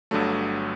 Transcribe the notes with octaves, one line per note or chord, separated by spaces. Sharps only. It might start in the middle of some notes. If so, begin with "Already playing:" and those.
G1 G2 D3 F#3 A3